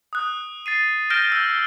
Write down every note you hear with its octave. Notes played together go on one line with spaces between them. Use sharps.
D#6 F#6
A6 C7 D#7
F6 G6 A#6 D7 E7 G7
E6 G6